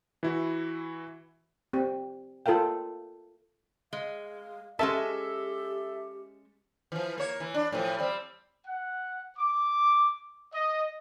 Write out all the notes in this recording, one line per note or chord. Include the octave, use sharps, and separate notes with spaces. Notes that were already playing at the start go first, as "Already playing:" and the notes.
E3 E4 F#4
C4 G4
F4 A4 A#4 F5 G5
G#3 F5
G#3 C#4 G4 A4 E5 A5
E3 F3
A#3 C#5
E3
D4
A2 E3 F3
G3 C4
F#5
D6
D#5